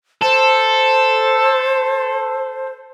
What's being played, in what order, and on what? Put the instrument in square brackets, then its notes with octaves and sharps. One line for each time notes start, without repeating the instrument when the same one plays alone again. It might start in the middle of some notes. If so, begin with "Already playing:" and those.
[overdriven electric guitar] A4 [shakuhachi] C5